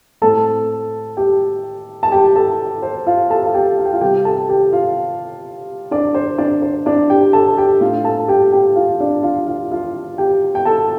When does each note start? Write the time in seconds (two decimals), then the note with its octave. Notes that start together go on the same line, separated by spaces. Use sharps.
0.22 A2 A3 C4 A4 A5
1.17 G4 G5
2.03 A5
2.12 G4 G5
2.36 A4 A5
2.82 C5
3.07 F4 F5
3.30 A4 A5
3.46 F5
3.54 G4 G5
3.77 F5
3.85 G5
3.93 F4 F5
4.01 C3 G3 C4 G4 G5
4.25 A4 A5
4.49 G4 G5
4.73 F4 F5
5.91 D4 D5
6.15 C5
6.38 D4 D5
6.62 C5
6.86 D4 D5
7.10 G4 G5
7.33 A4 A5
7.57 G4 G5
7.81 A2 A3 D4 F4 F5
8.05 A4 A5
8.28 G4 G5
8.52 G4 G5
8.76 F4 F5
9.00 D4 D5
9.23 F4 F5
9.47 F4 F5
9.72 F4 F5
10.18 G4 G5
10.55 G5
10.65 A4 A5